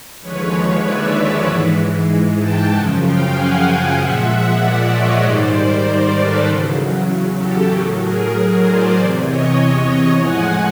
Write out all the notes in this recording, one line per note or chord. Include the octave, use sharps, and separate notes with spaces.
D#2 D3 F3 G#3 B4 C#5
D5 E5
G#2 E3 G#3 E5 F#5
G5 A5
F#2 C#3 F3 F#5 G#5
F5 G5
F#5 G#5
F5 G5
A#2 F3 G#3 E5 F#5
D5 E5
C#5 D#5
G#2 D#3 G3 C5 D5
A#4 C5
A4 B4
E2 C#3 F#3
G4 A4
A2 F#3 G#4 A#4
G#4 A#4
C5 D5
E2 C3 E3 C5 D5
C#5 D#5
A2 F3 G#3 F#5 G#5